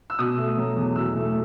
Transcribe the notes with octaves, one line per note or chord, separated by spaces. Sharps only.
E6
B2 D#6
A3
F#3
E2
B2 E6
A3